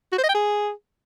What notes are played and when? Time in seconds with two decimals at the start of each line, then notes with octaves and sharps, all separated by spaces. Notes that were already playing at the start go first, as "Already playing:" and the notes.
0.12 F#4
0.18 C5
0.23 D#5
0.29 G5
0.34 G#4